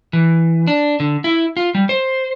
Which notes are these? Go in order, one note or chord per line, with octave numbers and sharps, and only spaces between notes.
E3
D4
D3
E4
F4
G3
C5